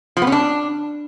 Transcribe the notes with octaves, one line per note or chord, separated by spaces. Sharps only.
F3
B3
C#4
D4